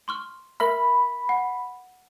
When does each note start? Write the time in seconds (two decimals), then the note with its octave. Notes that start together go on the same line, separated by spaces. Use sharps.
0.08 C6 C#6 F6
0.60 A#4 E5 B5 F6
1.29 F#5